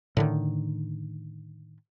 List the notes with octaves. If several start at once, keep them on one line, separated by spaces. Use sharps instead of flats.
A2 D3 D#3